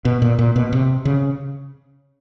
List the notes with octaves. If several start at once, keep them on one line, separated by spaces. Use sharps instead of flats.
B2
A#2
A#2
B2
C3
C#3